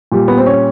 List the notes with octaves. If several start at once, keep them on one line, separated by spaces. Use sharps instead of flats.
A#2 G3
B3
C4
C#4